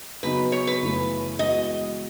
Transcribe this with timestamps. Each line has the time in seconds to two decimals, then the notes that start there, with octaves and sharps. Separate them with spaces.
0.23 C#3 F#3 B3 D#4 F#4 B4
0.52 C#5
0.67 B4
0.81 F#2 C#3 E3 A3
1.39 E3 G#3 B3 F#4 D#5